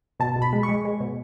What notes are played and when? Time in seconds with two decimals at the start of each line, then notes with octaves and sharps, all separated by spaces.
0.20 B2 A5
0.36 B2
0.42 B5
0.53 G#3
0.63 C#6
0.69 G#3
0.85 G#3
1.01 B2